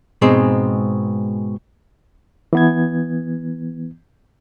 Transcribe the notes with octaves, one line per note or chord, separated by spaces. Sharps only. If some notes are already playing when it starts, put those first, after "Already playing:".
G#2 B2 G#3 C4
E3 B3 G#6